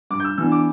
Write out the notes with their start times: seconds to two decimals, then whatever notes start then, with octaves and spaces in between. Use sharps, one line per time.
0.11 G2 D6
0.20 G6
0.24 E6
0.38 E3 B3 D4 E6
0.52 D6